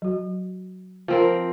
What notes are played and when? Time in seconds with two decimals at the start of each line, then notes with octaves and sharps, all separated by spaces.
0.02 F#3 F#4
1.08 F3 C4 A#4